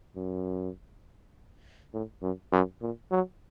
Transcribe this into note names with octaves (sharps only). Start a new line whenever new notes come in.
F#2
A2
F#2
F#2
A#2
F#3